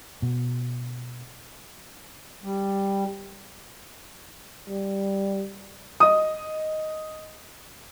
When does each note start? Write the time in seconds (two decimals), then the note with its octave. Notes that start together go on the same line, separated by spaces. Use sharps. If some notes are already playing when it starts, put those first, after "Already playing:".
0.22 B2
2.43 G3
4.69 G3
6.00 D#5 D#6